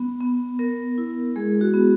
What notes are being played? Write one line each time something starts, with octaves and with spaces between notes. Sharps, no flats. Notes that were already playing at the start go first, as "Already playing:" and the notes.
Already playing: B3
B3
B3 A#4
E4
G#3 G#4
F#4
B3